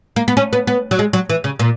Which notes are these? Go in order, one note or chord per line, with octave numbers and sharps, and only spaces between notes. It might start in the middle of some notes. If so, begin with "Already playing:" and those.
A#3
B3
C#4
B3
B3
F#3
G#3
F#3
E3
C#3
A#2